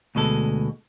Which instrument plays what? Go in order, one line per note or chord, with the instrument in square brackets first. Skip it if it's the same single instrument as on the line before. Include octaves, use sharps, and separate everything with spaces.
[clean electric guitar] D2 B2 G#3 A4